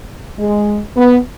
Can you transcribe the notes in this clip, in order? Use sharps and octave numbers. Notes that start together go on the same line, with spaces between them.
G#3
B3